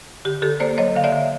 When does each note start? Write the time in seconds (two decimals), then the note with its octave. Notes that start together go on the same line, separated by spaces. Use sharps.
0.25 D3 G4
0.42 D3 G4 A4
0.60 A#3 C5 D5
0.78 F#3 C#5 D#5
0.95 D3 F5
1.04 D5 E5
1.12 D3